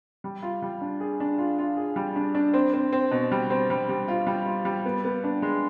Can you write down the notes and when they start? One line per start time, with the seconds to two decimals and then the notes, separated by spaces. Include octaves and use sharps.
0.24 G3
0.42 F4
0.62 G3
0.81 D4
1.00 G#4
1.20 D4
1.38 F4
1.59 F4
1.77 G#4
1.96 G3
2.16 D4
2.35 D4
2.54 C4
2.74 C4
2.92 C4
3.11 B2
3.31 G3
3.50 C4
3.70 G3
3.89 G3
4.08 F4
4.27 G3
4.46 F4
4.65 G3
4.85 B3
5.05 B3
5.24 D4
5.42 G#3